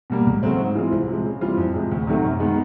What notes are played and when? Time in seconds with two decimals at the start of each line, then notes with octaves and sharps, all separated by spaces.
0.10 B2 G3 A#3
0.27 C#2
0.43 C#3 F#3 A3 C4
0.59 G#2
0.75 E3 G#3 C4 F4
0.92 C2
1.08 C3 F3 G#3
1.25 C#3
1.41 E3 G3 C4 F4
1.57 F2
1.74 C3 F3 G#3
1.91 D2
2.07 C3 D#3 F#3 A3
2.24 F#2
2.40 D#3 G#3 B3